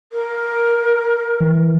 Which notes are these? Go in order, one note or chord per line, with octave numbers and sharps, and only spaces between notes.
A#4
E3